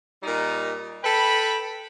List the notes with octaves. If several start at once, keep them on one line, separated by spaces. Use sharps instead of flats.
A#2 G3 D#4
A4 B4 G5 B5